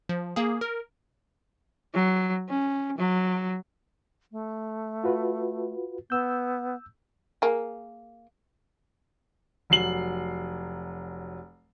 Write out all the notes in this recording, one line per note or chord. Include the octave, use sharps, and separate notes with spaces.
F3
A#3 G#4
A#4
F#3
C#4
F#3
A3
F4 F#4 B4
B3 E6 G6
A#3 G#4
F1 F#3 C7 F#7